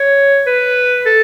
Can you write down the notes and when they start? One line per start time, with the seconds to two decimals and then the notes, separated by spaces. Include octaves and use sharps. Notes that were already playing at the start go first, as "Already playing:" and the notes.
Already playing: C#5
0.46 B4
1.05 A4